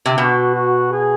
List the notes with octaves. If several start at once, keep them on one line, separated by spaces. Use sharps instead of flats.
C3
B2 F#4
F#4
G#4